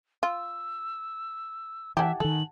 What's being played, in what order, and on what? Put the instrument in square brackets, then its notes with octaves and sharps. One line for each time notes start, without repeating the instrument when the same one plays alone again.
[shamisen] F4 [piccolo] E6
[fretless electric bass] E3 [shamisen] E4 G4 [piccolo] E5 [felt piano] F#5 G#5 A5
[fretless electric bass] D#3 E3 [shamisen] A4 [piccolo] F#7